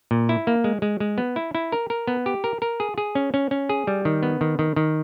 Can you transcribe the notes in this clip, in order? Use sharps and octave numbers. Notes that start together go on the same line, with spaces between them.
A#2
E4
A#3
G#3
G#3
G#3
B3
E4
E4
A#4
A#4
B3
G4
A#4
A#4
G#4
G#4
C#4
C#4
C#4
G#4
G3
D#3
B3
D#3
D#3
D#3